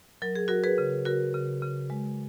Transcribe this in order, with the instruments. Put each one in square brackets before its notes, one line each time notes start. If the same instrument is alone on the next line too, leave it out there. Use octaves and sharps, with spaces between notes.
[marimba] F#3 A#4
G#4
F#3 F#4 A#4
G#4 B4
C#3
C#3 F#4 A#4
C#3
C#3
G#3